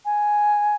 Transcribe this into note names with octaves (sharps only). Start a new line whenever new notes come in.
G#5